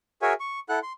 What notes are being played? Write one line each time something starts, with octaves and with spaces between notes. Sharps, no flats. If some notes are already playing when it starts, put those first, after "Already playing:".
F#4 G#4 A#4 C#5 E5 G#5
C#6
E4 A4 F#5 F#6
C6